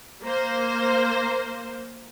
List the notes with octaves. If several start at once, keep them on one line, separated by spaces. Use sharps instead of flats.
A#3 C5